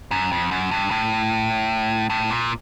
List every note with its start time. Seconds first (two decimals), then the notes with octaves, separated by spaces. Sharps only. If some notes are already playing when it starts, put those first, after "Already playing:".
0.11 F#2
0.32 F2
0.51 F#2
0.71 G2
0.91 A2
2.10 A2
2.30 A#2